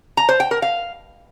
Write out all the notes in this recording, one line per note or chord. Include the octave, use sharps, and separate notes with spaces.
A#5
C5
G5
A#4
F5